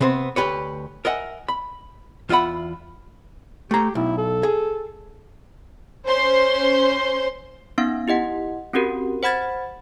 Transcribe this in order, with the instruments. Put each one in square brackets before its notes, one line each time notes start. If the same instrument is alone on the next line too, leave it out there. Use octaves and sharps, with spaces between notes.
[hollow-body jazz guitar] C3 B3 C4 C5
D2 G#2 G4 B4 C#5
A#4 D#5 E5 F#5 G#5
B5
E2 F4 E5 F#5 B5
[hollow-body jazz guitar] A3 A#5 [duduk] G4
[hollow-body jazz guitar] B1 [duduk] E4
[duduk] A4
[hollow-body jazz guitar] G#4
[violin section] C#4 C5 C6
[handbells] B3 C#4 D#4 F5
E4 G4 D#5 F#5
C4 C#4 F#4 G4 A#4
C5 F#5 B5 G#6 A6